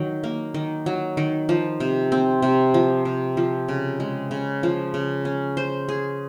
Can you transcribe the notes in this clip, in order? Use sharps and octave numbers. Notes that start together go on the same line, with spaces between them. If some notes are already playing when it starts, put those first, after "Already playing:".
Already playing: D#3 F#3
A#3
D#3
F#3
D#3
F3
C3
C4
C3
F3
C3
F3
C#3
G#3
C#3
F3
C#3
C#4
C5
G#4